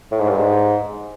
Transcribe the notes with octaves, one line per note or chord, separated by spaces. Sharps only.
A2
G#2
G2
G#2